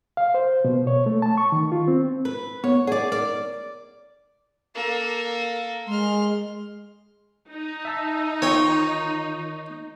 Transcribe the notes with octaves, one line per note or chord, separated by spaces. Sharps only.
F5
C5
B2
C#5
A3
A5
C#6
D#3
F4
C4
B4
B3 C#5
G#4 C#5 D5 F#5
A#4 D5
A#3 A4
G#3 C6 F6
D#4
E5 A5 E6
D#3 F4 C#5 G5